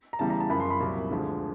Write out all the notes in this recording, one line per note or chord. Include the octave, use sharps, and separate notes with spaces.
A#5
E2 C#3 E3 G3 A5
A#5
A5
F#2 C#3 F3 B5
C6
B5
C2 A#2 F#3
D2 D3 F3 G#3